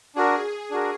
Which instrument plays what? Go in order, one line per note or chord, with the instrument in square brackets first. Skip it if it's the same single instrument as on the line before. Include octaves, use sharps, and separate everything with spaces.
[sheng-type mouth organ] D4 F#4 A#4 [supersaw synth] G#4
[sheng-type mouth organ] D4 F#4 A#4